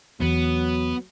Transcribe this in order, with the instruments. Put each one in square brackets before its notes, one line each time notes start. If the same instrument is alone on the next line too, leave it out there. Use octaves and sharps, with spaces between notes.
[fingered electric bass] E2 [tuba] F#3 [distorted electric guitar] B3